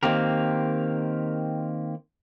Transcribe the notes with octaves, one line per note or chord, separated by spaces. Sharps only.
D#3 A#3 C4 G4 A#4